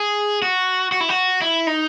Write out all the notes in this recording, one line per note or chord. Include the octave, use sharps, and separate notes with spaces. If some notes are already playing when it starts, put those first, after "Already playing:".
Already playing: G#4
F#4
F#4
E4
F#4
E4
D#4